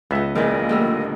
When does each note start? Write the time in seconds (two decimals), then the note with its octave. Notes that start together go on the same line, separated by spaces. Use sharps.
0.11 C#2 B3 D#5 E5
0.35 A#1 D#2 A#2 C#3 E3 D#5
0.69 D3 G3 A3